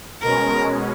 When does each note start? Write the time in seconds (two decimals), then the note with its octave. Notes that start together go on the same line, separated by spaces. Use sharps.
0.22 B2 G#3 C#4 A#4